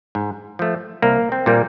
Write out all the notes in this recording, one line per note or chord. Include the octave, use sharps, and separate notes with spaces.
G#2
F3 A3
C2 A#3
C4
A#2 G3 A#3